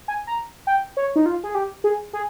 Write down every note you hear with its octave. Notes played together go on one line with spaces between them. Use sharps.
G#5
A#5
G5
C#5
D#4
F4
G#4
G4
G#4
G#4